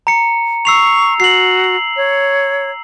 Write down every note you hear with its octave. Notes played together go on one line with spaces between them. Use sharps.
A#5 C#7
C#6 E6 C7 F7
F#4 C7 F#7
C#5